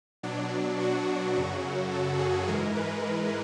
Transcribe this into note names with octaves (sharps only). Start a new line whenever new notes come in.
B2 F#3 D4
F#4
F#2 C#3 F#3
A4
G#4
G#2 E3 G#3 A#4
B4
A#4